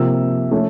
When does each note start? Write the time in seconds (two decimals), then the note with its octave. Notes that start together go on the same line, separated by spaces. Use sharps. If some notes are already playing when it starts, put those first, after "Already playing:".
Already playing: C3 F3 A#3 E6
0.51 F3 A3 C#4